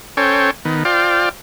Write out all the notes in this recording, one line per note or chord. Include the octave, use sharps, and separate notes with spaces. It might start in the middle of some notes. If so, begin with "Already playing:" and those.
C#4 A4 C5 C#5 G5
D#3 B3
F4 C5 D5 F5 G5